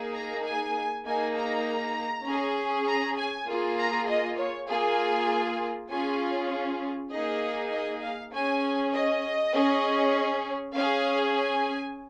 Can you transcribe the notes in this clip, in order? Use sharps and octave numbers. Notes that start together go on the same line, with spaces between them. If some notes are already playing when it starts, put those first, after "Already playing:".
Already playing: A#3 D#4 G#4
A#5
G#5
A#3 D#4 G#4 G#5
A#5
C#4 G#4
A#5
G#5
A#3 F4 G#4
A#5
D#5
C#5
A#3 F4 G#4 G#5
C#4 F4 G#4 G#5
A#3 D#4 G#4 D#5
D#5
F5
C#4 G#4 G#5
D#5
C#4 G#4
C#4 G#4 F5
G#5